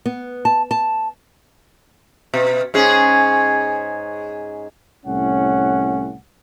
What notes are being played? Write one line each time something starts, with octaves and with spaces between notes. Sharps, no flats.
B3
A5
A5
B2
G#2 C#4 G#4
C2 A2 C#4 F#5